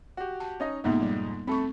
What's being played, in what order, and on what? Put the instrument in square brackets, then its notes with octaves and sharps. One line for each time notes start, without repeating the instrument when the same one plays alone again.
[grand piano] F#4 G4
[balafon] A5
[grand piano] C#4 D#4 D#5
[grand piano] F2 G#2 B2 [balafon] A#3 B3 D#4
[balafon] G3
[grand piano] A3 A4 B5 [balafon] C4 C#6